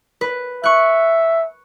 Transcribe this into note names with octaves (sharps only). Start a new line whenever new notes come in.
B4
E5 C#6 F#6